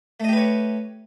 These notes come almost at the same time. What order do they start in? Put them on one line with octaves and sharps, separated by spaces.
A3 D#5 G4 B4 C#5